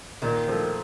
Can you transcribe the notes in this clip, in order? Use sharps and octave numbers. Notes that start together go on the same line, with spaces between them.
A#2 D#3
F3 A3